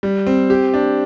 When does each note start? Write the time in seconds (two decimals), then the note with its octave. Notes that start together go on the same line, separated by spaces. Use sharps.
0.03 G3
0.26 C4
0.50 G4
0.74 D4